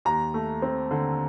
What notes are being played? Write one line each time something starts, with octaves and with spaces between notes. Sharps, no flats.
D#2 A#5
A3
C4
D3